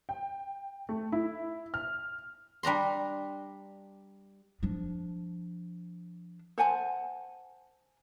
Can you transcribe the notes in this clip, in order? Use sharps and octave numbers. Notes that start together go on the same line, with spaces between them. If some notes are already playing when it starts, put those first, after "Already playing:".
G5
A3
E4
F6
G3 D4 A#5 C6
F3 D4
C5 F#5 G#5 A5